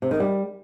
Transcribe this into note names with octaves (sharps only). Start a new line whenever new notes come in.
C3
D#3
G3